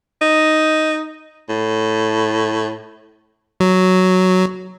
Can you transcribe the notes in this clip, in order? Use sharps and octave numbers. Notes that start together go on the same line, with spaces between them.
D#4
A2
F#3